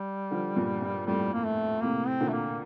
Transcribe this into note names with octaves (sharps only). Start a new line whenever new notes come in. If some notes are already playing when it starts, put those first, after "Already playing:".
Already playing: G3
D3 F3
G2 A#2
G2
F2 A2 G3
A#3
A3
A2 C3 A#3
C4
A#2 D3
A3
A#3